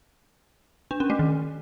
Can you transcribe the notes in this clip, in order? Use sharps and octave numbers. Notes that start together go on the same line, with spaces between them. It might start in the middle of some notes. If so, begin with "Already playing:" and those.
D4
C#4
A3
D#3